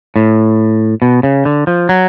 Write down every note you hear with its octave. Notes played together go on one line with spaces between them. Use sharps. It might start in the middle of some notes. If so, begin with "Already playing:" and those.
A2
B2
C#3
D3
F3
F#3